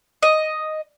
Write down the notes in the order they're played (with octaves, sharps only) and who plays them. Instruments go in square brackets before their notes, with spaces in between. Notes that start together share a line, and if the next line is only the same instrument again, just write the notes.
[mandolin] D#5